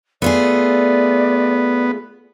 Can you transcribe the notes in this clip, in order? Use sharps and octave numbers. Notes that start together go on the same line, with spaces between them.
A3 B3 F4 G#4 D5